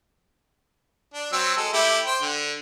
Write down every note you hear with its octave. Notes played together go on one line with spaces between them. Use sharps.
D4
F#3 C4 E6
G#3 A4
A3 E4 G4
C5 G5
D3